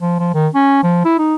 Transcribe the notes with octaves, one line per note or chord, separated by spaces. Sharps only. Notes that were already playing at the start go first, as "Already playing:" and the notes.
F3
F3
D#3
C#4
F3
E4
D#4